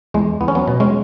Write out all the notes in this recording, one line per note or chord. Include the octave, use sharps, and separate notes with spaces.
E2 G#3
E2 B3
C#4
F#3 B3
B2
G#3 C#4